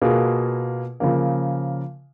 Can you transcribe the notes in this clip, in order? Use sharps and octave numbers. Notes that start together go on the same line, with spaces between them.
B2 A#3 F4 G#4 B4
C#3 F3 A#3